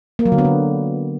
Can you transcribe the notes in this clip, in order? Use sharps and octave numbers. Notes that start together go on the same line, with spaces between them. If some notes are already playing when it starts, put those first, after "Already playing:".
A#3
F#3
D3
B3
D3